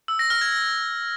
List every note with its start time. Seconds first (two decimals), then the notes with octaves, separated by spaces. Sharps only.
0.08 E6
0.19 A#6
0.30 F6
0.41 G#6
0.52 A#6